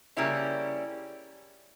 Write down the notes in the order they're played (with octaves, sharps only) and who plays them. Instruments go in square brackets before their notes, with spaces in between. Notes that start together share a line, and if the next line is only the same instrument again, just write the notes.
[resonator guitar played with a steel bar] C#3 G3 A#3 C#4 E4